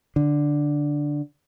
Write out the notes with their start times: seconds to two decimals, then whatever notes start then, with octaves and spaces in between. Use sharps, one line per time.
0.16 D3